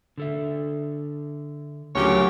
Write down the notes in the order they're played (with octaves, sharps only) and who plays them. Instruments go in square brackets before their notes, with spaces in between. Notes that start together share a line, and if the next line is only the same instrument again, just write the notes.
[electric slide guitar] D3 A4 E5
[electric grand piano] D2 C#3 F#3 [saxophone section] A#2 G4 [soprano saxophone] C#5